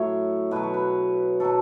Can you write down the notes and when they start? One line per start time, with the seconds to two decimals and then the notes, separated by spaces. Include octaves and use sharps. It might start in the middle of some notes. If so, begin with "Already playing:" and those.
Already playing: A2 F#3 C#5 E5
0.51 B2 F#3 B4
0.63 C#5
0.74 B4
1.40 B2 F#3 A4